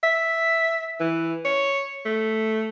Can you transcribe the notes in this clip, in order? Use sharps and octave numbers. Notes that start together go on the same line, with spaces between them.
E5
E3
C#5
A3